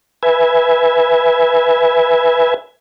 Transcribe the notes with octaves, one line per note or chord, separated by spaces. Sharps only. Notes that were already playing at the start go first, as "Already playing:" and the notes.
B4 E5 G#5